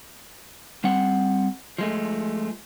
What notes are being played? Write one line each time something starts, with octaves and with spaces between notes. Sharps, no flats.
G3 C4 F#5
F3 G#3 A3